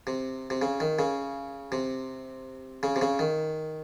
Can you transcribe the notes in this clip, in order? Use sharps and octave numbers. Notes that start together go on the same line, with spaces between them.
C3
C3
C#3
D#3
C#3
C3
C#3
C3
C#3
D#3